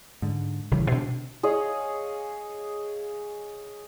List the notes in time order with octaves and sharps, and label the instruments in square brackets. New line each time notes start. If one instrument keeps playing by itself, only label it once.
[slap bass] G#2 D3
A#1 C#3 E3 G3
B2 D4
[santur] G#4 C#5 D#5 F5